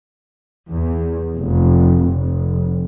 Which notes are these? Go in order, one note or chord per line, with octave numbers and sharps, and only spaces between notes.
E2
F1
F1